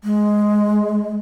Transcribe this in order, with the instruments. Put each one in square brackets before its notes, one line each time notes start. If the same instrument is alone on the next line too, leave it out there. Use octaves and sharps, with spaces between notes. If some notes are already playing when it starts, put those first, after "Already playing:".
[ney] G#3